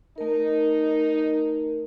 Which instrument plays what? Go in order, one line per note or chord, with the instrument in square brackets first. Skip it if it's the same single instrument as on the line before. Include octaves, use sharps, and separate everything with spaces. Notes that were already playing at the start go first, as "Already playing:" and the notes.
[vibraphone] A3 A#4 [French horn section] D#4